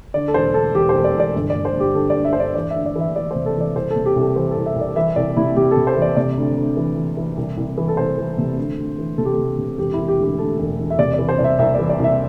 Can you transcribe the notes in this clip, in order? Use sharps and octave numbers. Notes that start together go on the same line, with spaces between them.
D3 D5
A4
E1 C5
D2 A4
E1 G4
C5
E1
D5
E1
D5
G1
D5
G1
C5
G1 G4
D3 A4
D5
G2
E5
C5
G2 D5
E3 D5
E5
D2
D5
E3
E5
E3 D5
C3 C5
A4
E3 D5
C2 C5
A4
C3
G4
C2
A4
E3 C5
C2 A4
E5
C2
D5
E3 E5
C2 D5
C3 E4
C3 G4
A4
C3
C5
E3
D5
C3 D5
D2
D2
E3
E3
E3
C2
C2
E3
A4
C2 C5
E3
C3
D2
D2
E3
C3 A4
G4
A4
C3
C3
E1 G4
E1 E4
G4
D2
G4
D2 A4
E1
E1
E5
C3 D5
E3 D5
C5
C2 D5
E5
C2 E5
E3 D5
D5
C2 E5